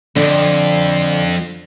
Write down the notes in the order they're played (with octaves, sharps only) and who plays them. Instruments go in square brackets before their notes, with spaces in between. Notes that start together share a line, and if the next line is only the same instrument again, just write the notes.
[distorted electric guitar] F2 [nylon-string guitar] D3